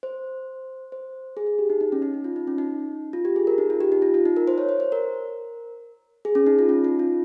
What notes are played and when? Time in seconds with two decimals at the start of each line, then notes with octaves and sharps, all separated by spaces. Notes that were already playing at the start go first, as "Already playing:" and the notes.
0.03 C5
0.92 C5
1.37 G#4
1.47 G#4
1.59 G4
1.70 D#4
1.81 D#4
1.92 C#4
2.02 D#4
2.14 D#4
2.24 F4
2.36 D#4
2.47 C#4
2.58 D#4
3.13 F4
3.25 G4
3.36 G#4
3.47 A#4
3.58 D#4
3.70 F4
3.81 G4
3.92 D#4
4.02 F4
4.14 F4
4.25 D#4
4.37 A#4
4.48 C5
4.58 C#5
4.69 C5
4.80 C5
4.92 A#4
6.25 G#4
6.35 C#4
6.47 D#4
6.59 F4
6.69 C#4
6.84 D#4
6.99 F4